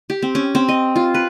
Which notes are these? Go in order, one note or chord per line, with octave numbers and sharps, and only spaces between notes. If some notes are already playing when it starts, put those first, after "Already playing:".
G4
C4
C#4
C4
D#5
F4
B4